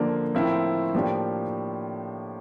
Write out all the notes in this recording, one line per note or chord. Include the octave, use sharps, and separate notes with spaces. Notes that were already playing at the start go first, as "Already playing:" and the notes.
Already playing: D3 F3 A#3 D4
A2 F3 C4 E4 A#4
A2 F3 A#3 D4 G4